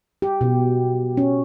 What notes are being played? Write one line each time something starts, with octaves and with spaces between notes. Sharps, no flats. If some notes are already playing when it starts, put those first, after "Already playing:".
G4
B2
C#4